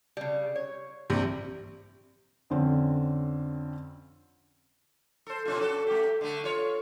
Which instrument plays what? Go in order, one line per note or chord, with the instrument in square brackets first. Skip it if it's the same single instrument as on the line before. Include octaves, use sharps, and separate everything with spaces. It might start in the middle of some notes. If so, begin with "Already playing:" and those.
[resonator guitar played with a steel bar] C#3 G3
C#5
[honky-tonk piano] A#1 C3 [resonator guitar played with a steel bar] G4
[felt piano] F2 D3 C4 C#4
[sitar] A4 C5
B2 C#4 F4
C#4 F#4 A4
A3 G4
D3 A3
F4 C#5